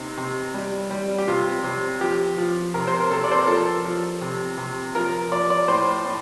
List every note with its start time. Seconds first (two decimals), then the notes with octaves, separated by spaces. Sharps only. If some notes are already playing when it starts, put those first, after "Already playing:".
Already playing: C3 D#4
0.17 C3
0.54 G3
0.91 G3
1.18 G4
1.28 C3 F4
1.64 C3
2.01 F3 G4
2.38 F3
2.74 C3 A#4
2.87 C5
3.00 A#4
3.11 C3 A4
3.24 D5
3.31 C5
3.39 A#4
3.47 F3 A4
3.85 F3
4.21 C3
4.58 C3
4.95 F3 A#4
5.32 F3 D5
5.50 D5
5.68 A2 C5
6.06 A2